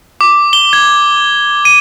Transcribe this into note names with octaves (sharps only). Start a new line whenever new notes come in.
D6
G7
G#6
D#7